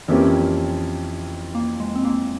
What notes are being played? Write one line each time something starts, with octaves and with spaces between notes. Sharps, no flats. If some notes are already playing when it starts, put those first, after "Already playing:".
F2 E3 A#3 C4 C#4 G4
A#3
G#3
C4
A#3